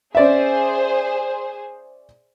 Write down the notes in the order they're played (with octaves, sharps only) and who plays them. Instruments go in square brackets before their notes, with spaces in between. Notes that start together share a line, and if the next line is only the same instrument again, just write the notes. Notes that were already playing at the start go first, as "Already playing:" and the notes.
[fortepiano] C#4 D5 E5 [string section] G#4 C5